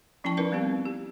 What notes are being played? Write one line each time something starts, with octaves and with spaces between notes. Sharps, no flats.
F3 C#4 E4 G5 A5 C#6
D#4 E4 A#4 B4 D5
G3 B3 C4 G4 F5
G4